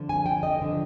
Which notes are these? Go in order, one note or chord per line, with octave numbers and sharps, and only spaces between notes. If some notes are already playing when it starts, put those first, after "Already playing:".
Already playing: D3 F3
G#5
G5
D#5
D3 F3